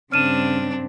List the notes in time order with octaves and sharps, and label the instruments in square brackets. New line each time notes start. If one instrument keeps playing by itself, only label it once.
[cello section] G2 C#3 [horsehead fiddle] C4 [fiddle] D4 [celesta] F6 D#7 E7